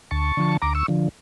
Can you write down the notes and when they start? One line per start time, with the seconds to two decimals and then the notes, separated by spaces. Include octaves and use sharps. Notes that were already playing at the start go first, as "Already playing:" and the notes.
0.11 D2 A5 C#6
0.37 D3 F3
0.62 D2 A#5 D6
0.75 C#6 E6
0.88 D3 F3